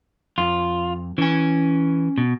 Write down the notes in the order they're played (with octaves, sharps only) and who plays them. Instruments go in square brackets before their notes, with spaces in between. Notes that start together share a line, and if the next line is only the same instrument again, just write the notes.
[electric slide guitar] F2 [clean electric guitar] F4
[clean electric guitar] E3 [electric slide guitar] C#4 G#5
[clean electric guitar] B2